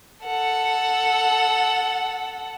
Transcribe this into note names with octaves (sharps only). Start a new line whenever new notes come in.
A4 F#5